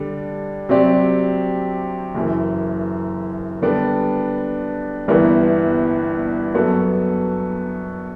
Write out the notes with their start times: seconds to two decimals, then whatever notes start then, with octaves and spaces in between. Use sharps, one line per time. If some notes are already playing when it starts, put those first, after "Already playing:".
Already playing: D3 G3 D4
0.69 C3 F#3 C4 G4 D5
2.14 F#1 F#2 E3
3.62 D3 G3 B3 D4
5.08 G1 G2 E3 B3
6.54 F#2 F#3 B3 F#4 A4